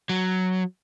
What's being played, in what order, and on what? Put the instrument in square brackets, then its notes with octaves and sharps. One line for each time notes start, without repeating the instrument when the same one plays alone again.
[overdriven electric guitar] F#3